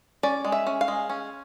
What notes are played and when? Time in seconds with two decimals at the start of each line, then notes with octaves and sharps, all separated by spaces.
0.23 C#4 D5
0.45 G#3
0.52 E5
0.67 C#4
0.81 F5
0.88 G#3
1.09 C#4